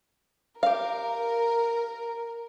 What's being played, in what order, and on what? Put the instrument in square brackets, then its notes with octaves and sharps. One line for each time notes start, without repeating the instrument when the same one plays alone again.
[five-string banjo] G4 F5 [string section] A#4